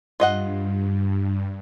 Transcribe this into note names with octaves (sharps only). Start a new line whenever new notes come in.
G2 F4 D#5 F#5